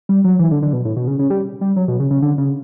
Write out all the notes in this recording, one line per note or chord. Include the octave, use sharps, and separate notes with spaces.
G3
F#3
E3
D3
D3
B2
A2
B2
C#3
C#3
G3
G3
F#3
B2
C#3
C#3
D3
C#3